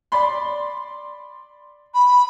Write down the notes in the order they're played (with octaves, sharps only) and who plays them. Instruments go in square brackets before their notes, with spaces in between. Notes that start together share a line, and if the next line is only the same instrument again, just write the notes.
[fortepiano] D5 B5 C6
[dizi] B5